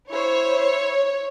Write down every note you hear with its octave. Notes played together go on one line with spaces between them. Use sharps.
E4 C5 C#5